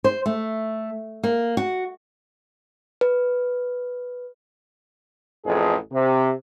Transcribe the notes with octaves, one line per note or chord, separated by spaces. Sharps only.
C5
A3
A#3
F#4
B4
A1 F2 G#4
C3